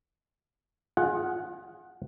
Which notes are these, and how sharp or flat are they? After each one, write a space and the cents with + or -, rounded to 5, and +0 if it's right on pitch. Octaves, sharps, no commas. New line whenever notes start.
F4 +25 G#4 +0 F#5 +0